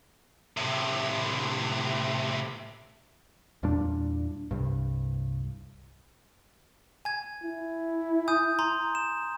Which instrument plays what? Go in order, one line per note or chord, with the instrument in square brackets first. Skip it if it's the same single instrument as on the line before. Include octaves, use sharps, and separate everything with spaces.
[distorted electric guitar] A2 C3
[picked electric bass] E2 A#2 G3 D4
C2 G2
[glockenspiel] G#5 G#6
[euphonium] E4
[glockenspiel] G#5 D#6 G6
G#5 A#5 C6
E7